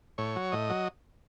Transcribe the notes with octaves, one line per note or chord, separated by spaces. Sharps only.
A2 C#5
F#3
A2 D#5
F#3